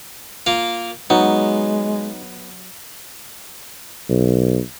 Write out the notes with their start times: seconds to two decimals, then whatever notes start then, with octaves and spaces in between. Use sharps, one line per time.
0.47 A#3 F4
1.10 F#3 G#3 B3 D#4
4.09 B1